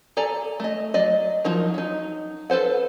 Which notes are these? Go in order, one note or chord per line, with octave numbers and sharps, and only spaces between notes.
A4 D5 G#5 A#5
A3 D#5
F#3 D5 D#5
F3 F#3 D#4 A#4
F#3 D#4
A4 B4 C5 F#5